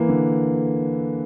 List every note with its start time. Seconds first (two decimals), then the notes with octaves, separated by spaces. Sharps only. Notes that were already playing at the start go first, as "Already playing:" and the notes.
Already playing: E3 A#3
0.08 D3